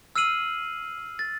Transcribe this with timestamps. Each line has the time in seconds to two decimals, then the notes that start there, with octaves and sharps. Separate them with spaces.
0.16 E6 F6 C7 D#7 F#7
1.19 A6